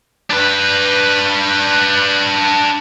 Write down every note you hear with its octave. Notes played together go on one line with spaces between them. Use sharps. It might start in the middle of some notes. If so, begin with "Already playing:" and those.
D4 B4